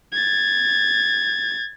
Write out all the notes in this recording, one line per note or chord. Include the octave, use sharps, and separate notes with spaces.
G#6 A6